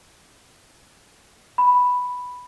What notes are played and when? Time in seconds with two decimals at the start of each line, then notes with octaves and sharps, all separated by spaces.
1.58 B5